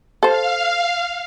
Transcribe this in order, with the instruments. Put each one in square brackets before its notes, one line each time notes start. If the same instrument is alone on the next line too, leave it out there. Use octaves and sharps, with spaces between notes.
[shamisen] A4 C5 [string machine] F5